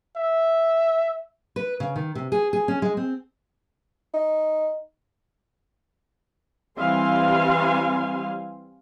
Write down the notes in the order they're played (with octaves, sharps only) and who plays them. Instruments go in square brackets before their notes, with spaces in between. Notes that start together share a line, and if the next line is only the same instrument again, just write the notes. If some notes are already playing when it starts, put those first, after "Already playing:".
[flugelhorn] E5
[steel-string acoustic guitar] B4
C#3
D#3
C3
G#4
G#4
C#4
G#3
C4
[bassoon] D#4
[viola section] E3 G3 C4 F5 G#5 C6